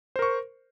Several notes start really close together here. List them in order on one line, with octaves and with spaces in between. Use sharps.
C5 A#4 C#6